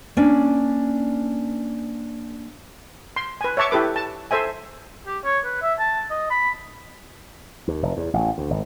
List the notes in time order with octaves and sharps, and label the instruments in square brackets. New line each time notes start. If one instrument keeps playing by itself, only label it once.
[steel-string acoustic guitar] A#3 C#4 D4 D5
[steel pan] C6
B4 G#5
C#5 E5 A5 C#6 D6
E4 G4 A4 B4 D6
A5
A4 C5 E5 G#5
[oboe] G4
C#5
B4
E5
A5
D#5
B5
[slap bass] D#2
F1
E2
A1
D2
G#1